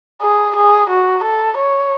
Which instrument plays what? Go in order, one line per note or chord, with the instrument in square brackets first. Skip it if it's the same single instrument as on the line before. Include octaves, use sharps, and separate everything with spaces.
[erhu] G#4
G#4
F#4
A4
C#5